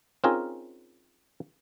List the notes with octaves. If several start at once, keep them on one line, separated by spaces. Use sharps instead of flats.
C4 C#4 D#4 F4 G#4 A#4